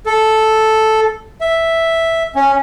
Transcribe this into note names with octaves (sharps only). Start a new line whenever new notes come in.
A4
E5
C#4